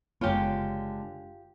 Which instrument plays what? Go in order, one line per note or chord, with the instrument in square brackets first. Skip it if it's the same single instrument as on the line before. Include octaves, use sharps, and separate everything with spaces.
[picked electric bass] F#1 B3 [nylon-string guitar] D3 G#3 C#5 [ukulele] F4 G4